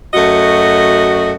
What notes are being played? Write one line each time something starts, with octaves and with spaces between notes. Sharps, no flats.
F#2 A3 F#4 D#5